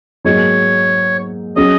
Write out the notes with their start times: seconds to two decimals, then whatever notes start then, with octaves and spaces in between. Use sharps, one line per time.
0.25 G#2 F#3 A#3 D#4 G#4 C#5
1.56 F#3 C#4 G#4 D#5